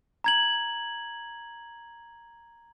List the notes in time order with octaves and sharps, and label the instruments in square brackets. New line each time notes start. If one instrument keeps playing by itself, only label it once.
[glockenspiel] A#5 G#6 F#7